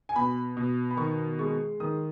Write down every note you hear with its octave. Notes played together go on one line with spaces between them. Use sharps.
G#5
B2 B5
B2
B5
D#3 C#6
G#3 C#6
D#3 D#6